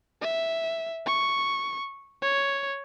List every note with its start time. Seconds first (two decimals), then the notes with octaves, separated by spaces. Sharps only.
0.22 E5
1.06 C#6
2.22 C#5